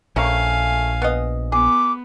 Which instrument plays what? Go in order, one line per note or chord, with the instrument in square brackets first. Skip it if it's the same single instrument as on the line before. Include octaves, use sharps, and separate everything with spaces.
[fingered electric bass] A#1 [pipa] A3 A#3 C#4 [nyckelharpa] F5 G#5
[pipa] B3 D#5
[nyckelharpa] B3 [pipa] G#4 [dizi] D6